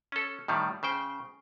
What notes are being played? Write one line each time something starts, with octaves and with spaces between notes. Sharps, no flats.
C#4 A4
A2 D#3 G3
C#3 C5 G5